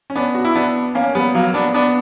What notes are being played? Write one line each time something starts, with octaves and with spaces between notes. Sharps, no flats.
C#4
B3 D4
F#4
E4
B3 D4
A#3 C#4
G3 B3
F#3 A#3
B3 D4
B3 D4